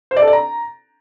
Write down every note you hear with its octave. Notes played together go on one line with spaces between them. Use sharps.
C5
D5
A4
D5
A#5